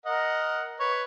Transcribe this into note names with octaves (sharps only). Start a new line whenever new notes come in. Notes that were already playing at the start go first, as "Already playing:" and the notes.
A#4 D#5 F#5
B4 C#5